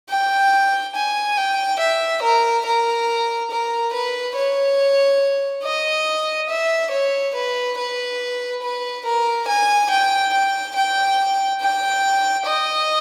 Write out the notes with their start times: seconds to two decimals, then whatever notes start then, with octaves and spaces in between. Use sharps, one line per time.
0.10 G5
0.96 G#5
1.37 G5
1.80 E5
2.23 A#4
2.65 A#4
3.51 A#4
3.93 B4
4.36 C#5
5.64 D#5
6.50 E5
6.91 C#5
7.35 B4
7.78 B4
8.62 B4
9.05 A#4
9.48 G#5
9.91 G5
10.33 G5
10.76 G5
11.60 G5
12.46 D#5